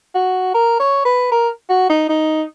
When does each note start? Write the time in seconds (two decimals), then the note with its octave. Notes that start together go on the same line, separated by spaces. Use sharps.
0.15 F#4
0.54 A#4
0.80 C#5
1.05 B4
1.31 A#4
1.70 F#4
1.89 D#4
2.09 D#4